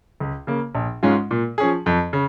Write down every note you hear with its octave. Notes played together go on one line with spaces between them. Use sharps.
C#2
C#3 A#3
A#1
G#2 G#3 C#4 F4
A#2
F3 C#4 G#4
F2
C#3